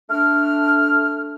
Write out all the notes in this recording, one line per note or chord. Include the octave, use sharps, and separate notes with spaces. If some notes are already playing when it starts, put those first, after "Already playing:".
A3 D4 F6